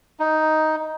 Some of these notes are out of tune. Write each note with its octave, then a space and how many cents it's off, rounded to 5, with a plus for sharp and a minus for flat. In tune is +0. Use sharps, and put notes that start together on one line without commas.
D#4 +5